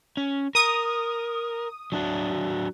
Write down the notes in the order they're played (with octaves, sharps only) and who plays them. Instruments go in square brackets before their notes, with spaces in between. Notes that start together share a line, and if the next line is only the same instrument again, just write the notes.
[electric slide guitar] C#4
[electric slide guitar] A#4 [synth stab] D#6
[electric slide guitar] F#3 D4 F#4